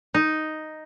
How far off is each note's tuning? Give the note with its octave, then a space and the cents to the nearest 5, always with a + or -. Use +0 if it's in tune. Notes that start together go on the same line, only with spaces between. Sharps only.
D#4 +0